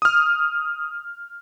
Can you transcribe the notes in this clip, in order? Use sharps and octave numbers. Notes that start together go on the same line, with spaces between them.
D#6 F6